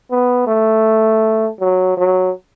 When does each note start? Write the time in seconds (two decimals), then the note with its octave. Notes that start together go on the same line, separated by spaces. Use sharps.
0.11 B3
0.47 A3
1.60 F#3
1.97 F#3